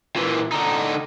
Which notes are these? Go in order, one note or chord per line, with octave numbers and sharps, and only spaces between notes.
A#2 E3
D3 D#4